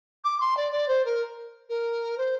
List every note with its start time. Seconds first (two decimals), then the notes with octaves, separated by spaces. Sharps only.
0.24 D6
0.40 C6
0.57 D5
0.72 D5
0.88 C5
1.05 A#4
1.69 A#4
2.18 C5